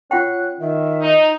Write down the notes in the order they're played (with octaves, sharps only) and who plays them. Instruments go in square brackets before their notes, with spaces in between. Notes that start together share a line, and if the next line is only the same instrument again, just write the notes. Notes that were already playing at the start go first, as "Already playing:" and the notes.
[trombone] C#4 [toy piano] F4 F#5 G5 [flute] F#6
[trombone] D#3 [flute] E5
[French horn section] D#4